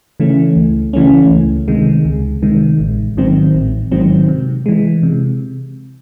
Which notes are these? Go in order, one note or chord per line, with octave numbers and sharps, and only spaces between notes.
C#3 E3 A3 C#4
C#2
C#3 E3 A3 C#4
C#2
C3 D#3 G#3
C#2
C3 D#3 G#3
A1
G#2 D#3 F#3 C4
A1
G#2 D#3 F#3 C4
C3
E3 G#3
C3